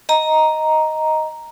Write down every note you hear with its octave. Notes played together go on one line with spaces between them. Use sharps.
D#5 A#5